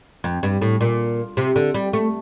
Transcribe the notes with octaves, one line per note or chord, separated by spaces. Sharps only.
F2
G2
A2
A#2
C3
D3
G3
A3